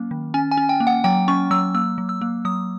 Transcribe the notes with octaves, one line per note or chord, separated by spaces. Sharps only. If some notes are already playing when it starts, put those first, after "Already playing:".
Already playing: F#3 A#3 C#4
D#3
C#4 G#5
G#5
C#4
G5
A#3
F#5
F#3 G5
C#4 C#6
F#3 E6
A#3 E6
F#3
E6
A#3
F#3 D#6